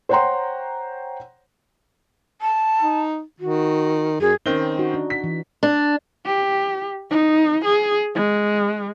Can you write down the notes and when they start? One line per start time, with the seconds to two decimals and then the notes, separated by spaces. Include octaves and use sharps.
0.09 C5 C#5 F#5 G5 A#5 C6
2.41 A5
2.81 D#4
3.40 D#3 F#4
4.21 F#2 G#4
4.46 D#3 C4 C#4 D#4 G7
4.79 D#4 F#4
4.94 D4
5.10 B6
5.24 E3
5.63 D4
6.26 G4
7.10 D#4
7.65 G#4
8.15 G#3